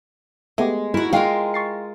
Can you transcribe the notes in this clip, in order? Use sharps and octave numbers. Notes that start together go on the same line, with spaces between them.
G#3 A3 B3 G4
E4 F#4 A#4
G#3 F4 A#4 F5 G5
C#6 A6 C7